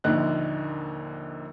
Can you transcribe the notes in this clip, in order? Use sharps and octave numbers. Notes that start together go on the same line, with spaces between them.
A#1 D#2 D3 D#4 F#6